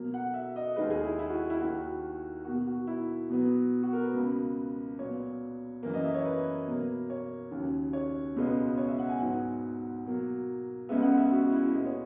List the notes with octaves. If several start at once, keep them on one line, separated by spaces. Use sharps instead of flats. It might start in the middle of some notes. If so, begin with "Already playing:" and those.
Already playing: B2 F#3 A#3
F#5
E5
D#5
D#2 D#3 G#3 B4
G#4
E4
E4
F#4
E4
D#2 D#3 A#3 F#4
B2 A#3 F#4
F#4
E4
B2 F#3 B3
F#4
A#4
B4
C#2 B2 A#3
A#2 F#3 B3 C#5
F#2 E3 A#3
D#5
E5
C#5
B4
B2 A#3
C#5
D#2 C#3 F#3
C#5
C#2 B2 G#3 B3
C#5
E5
F#5
G#5
G#2 F#3 B3 F#5
B2 F#3 A#3
C#2 C#3 G#3 B3 E5
F#5
E5
F#4
E4
A#2 G#3 B3 D#5
C#5